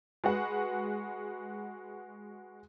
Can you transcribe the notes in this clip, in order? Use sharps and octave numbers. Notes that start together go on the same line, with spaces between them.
G#3 F#4 B4 F#5